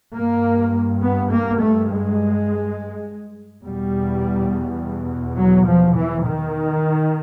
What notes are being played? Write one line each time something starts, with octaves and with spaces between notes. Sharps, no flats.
G2 A#3
B3
A#3
A3
G#3
E2 B2 G3
F#3
F3
E3
D#3